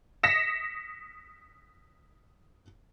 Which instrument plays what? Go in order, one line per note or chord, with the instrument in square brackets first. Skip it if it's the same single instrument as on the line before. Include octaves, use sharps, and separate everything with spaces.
[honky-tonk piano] D#6 A#6 B6 C#7 E7